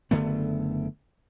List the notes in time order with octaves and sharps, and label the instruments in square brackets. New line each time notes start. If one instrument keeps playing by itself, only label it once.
[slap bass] F#1 D3 A3 B3